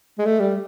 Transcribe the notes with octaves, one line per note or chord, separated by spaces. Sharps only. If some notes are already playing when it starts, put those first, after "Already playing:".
G#3
A3
G3